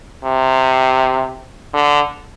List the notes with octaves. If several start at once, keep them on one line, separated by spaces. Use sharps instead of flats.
C3
D3